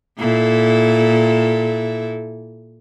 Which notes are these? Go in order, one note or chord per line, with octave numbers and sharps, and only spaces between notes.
A#2 E4 A4